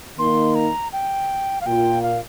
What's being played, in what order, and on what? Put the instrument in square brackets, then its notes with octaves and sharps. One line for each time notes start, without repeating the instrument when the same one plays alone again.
[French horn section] D#3 A#3 D#4 [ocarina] C6
[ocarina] A#5
G5
F5
[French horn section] A#2 A#3 F4 [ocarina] G5
[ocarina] F5